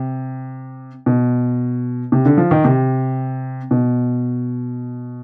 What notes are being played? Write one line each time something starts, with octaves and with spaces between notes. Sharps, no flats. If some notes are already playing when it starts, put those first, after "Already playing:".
Already playing: C3
B2
C3
D3
F3
D#3
C3
B2